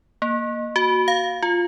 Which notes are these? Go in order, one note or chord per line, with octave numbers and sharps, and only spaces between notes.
A#3
F#4
F5
F4